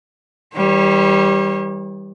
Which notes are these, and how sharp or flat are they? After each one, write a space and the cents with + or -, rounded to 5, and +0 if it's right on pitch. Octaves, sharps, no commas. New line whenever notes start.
E3 -40 G3 +0 C#5 -40